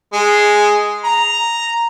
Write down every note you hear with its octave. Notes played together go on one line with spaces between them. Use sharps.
G#3
A#5